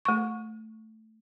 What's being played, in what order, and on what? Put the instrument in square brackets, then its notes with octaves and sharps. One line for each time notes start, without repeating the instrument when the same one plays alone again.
[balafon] A3 C#6